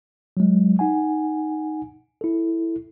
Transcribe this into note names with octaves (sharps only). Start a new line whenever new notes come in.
F#3 G#3
D#4 F#5 G#5
E4 A4